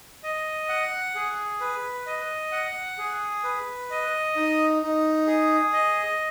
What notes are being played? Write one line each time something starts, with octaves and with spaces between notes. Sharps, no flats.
D#5
F#5
G#4
B4
D#5
F#5
G#4
B4
D#5
D#4
D#4
G#4
D#5